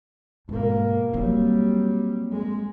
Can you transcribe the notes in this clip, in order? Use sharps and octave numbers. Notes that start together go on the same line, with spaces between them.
G#2 B2 A#3
F#3 G3 A#3 C4
G#3